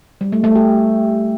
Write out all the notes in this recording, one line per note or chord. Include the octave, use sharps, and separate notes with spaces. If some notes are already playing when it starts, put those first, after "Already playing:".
G3
A3
A3
G4